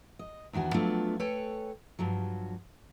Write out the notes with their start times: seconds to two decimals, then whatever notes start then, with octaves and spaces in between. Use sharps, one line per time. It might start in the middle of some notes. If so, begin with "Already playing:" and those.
0.19 D#5
0.53 E2 D#3 D4 F#4 G#5
0.74 F3 F#3 A3 B3 D4 F4
1.20 A4 B4 C#5 G5 G#5
1.99 G2 F3 F#3